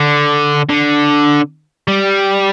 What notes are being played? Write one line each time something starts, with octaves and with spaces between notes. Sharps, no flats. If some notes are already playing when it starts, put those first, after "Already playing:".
Already playing: D3
D3
G3